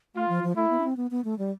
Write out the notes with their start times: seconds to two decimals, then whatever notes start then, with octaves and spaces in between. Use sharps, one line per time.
0.15 A3 F4
0.29 F3
0.43 F3
0.56 A3 E4
0.70 B3
0.80 D4
0.84 C4
0.97 B3
1.11 B3
1.24 A3
1.39 G3